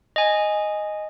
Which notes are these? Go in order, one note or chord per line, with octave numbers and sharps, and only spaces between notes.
D#5 G#5